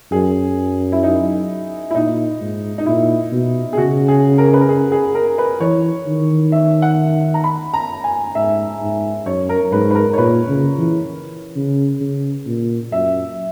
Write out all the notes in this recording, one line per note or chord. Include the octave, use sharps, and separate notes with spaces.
F#2 G#4
E4
D#4
E4
A#2 D#4
G#2
D#4
A#2 E4
B2
G#4
C#3 F#4
G#4
A#4
B4
A#4
G#4
G#4
A#4
B4
E3 C#5
D#3
E5
F#5
A#5
B5
A#5
G#5
G#2 E5
G#2
F#2 C#5
A#4
G#2 B4
B4
A#4
C#5
A#2 B4
C#3
E3
C#3
C#3
A#2
F#2 E5